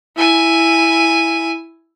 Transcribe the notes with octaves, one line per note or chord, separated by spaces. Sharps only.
E4 G#5